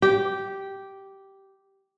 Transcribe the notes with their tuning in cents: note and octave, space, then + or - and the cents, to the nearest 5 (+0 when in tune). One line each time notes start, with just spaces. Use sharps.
G4 -10